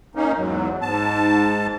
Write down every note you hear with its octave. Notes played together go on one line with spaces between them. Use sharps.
A#3 C#4 D#4
E2 G#2 F#3
G#2 A5